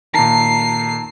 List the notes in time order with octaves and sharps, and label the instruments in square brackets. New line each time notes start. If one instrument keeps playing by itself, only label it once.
[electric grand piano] A#2 D#3 [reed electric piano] A5 A#5 [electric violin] C7